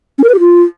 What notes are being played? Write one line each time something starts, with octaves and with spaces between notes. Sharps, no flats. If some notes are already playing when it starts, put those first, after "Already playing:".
C#4
A#4
B4
G4
F4